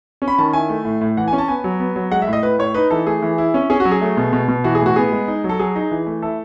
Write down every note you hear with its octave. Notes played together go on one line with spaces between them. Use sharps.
C#4
B5
D#3 A5
E4 G#5
A3
A2
A2
E3 F#5
G#5
C#4
A5
B3 G#5
F#3
B3
F#3
G#3 F#5
E5
A2
D#5
A2 B4
A2 C#5
D#4 B4
E3 A4
A3 G#4
E3
E4
C#4
C#4 G#4
F#4
F#3
G#4
A3
B2
B2
B2
E3 F#4
G#4
A2
F#4
B3 G#4
G#3
D#4
F#3
A4
F#3 G#4
D#4
E3
A3
E4 A4